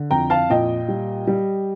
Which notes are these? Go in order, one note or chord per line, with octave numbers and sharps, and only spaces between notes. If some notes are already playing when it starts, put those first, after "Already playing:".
Already playing: D3
F2 G5 A#5
F5 A5
A#2 D#5 G5
G3
G3